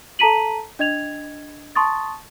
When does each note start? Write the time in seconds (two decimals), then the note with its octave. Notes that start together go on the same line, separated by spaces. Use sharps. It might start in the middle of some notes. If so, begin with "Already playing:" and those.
0.19 A4 A5 A#5 B6 D#7 F#7
0.79 D4 D#5 G#6 F7
1.75 A5 C6 C#6 D#6 A6